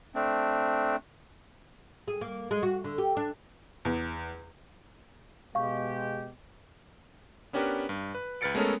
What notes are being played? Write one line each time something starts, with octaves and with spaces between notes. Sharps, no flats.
A3 C4 D4
G#4
A#3
G#3
F#4
D3
G4
D4
E2
B2 G#3 G4 F5 C#6
B3 C#4 D4 G4 A#4 B4
G2
B4
C#2 B4 F6 A6 C#7 D7
G#3 A3 B3 C#4 A4 A#4